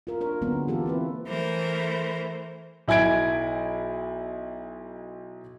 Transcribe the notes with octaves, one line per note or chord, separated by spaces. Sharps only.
F4 A#4
D4 A#4 C#5
D3 F#3 G#3 A#3 B3 C#4
E3 A#3 F4 G4 A4
C4 E4 B4
E3 A3 A#4 C5
B1 E4 G#5 G#6 D7